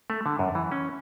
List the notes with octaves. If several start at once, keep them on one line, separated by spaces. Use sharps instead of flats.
A3
D3
F#2
E3
C#4